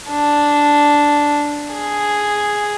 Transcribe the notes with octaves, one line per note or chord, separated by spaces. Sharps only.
D4
G#4